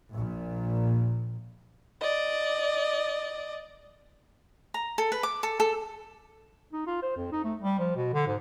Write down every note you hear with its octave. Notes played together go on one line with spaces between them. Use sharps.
A#1 A#2
D5 D#5
A#5
A4
B4
D6
A4
A4
D#4
F4
C5
F2
D#4
A3
G3
F3
B2
D3
G#2